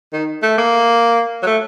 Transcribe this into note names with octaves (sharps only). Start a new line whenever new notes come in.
D#3
A3
A#3
F#3
A3